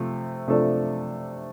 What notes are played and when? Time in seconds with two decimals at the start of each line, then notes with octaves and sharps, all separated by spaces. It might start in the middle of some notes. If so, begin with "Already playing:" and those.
Already playing: C3 F3 A3
0.47 C3 F3 A3 D4 A4